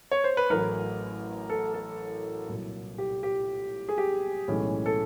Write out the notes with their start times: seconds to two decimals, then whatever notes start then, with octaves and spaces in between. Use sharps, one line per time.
0.11 C#5
0.24 C5
0.37 B4
0.50 A1 A2 F#3 A#4
1.50 A4
1.74 A4
2.48 C2 A#2 F#3
2.98 G4
3.23 G4
3.89 G#4
3.98 G4
4.48 B1 A2 E3 G#3 C#4
4.86 A4